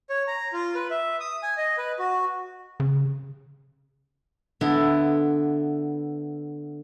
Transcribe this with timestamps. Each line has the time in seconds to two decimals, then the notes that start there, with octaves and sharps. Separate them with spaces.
0.10 C#5
0.27 A#5
0.53 F4
0.75 B4
0.91 E5
1.20 D#6
1.43 G#5
1.57 D#5
1.78 B4
1.99 F#4
2.80 C#3
4.61 D3 B3 E4